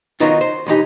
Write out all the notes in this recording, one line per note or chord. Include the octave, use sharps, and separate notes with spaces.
D#3 F3 F#3 B3 D#4 F4
C5
B1 E3 D#4 G4